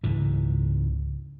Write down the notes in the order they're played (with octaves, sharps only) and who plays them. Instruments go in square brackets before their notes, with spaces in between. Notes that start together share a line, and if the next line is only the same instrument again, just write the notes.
[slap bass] C#2 G#2 E3